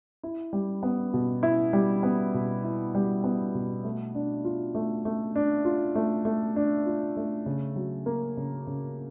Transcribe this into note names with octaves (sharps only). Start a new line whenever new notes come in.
E4
G3
B3
B2
E4
G3
B3
B2
E4
G3
B3
B2
A3
D4
F4
A3
A3
D4
F4
A3
A3
D4
F4
A3
C#3
F#3
A#3
C#3
C#3